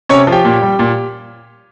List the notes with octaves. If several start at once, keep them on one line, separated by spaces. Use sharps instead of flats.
C3 C#4 C#5
F3
G4 G5
A#2
G3
A#2